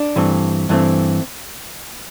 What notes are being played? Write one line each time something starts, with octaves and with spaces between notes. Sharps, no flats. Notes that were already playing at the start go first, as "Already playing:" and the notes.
Already playing: D4
G2 E3 A3 C4
G2 E3 A3 C4